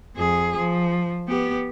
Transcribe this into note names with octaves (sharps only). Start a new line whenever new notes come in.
F2 G#4
F3
B3 G4